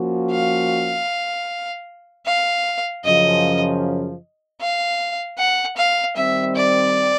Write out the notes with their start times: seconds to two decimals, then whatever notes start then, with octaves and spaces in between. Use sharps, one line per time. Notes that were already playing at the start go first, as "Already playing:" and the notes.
Already playing: F3 A#3 C#4 F#4
0.32 F5
2.26 F5
3.05 F#2 C#3 F3 D#5
4.61 F5
5.38 F#5
5.77 F5
6.16 D#3 G3 C4 E5
6.56 D5